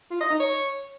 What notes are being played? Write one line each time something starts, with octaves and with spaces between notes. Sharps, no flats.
F4
D#5
D#4
C#5